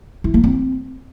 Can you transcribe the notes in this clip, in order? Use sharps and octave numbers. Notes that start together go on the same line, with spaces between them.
E4
A#3
C4